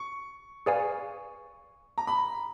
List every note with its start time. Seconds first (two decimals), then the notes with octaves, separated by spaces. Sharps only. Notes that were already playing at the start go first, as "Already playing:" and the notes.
Already playing: C#6
0.66 G#4 B4 D5 F5 G#5
1.98 A#5
2.07 B5